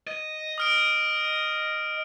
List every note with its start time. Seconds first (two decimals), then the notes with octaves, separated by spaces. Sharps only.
0.07 D#5
0.58 D#6 F6 D7